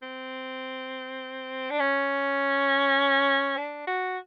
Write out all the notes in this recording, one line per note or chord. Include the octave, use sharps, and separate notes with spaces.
C4
D4
C#4
D4
F#4